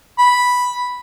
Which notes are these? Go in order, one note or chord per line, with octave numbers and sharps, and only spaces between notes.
B5